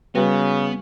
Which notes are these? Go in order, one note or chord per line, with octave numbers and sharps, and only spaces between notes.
C#3 G3 B3 F#4 B4